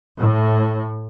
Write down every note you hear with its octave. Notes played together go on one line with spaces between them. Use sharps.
A2